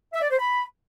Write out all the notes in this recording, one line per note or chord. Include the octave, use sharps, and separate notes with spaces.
E5
D5
C5
B5